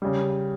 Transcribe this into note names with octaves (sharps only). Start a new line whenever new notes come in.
C#3 G3